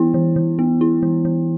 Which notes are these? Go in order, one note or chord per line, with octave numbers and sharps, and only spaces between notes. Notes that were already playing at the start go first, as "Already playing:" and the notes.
Already playing: E3 B3 E4
E3
E3
B3
E4
E3
E3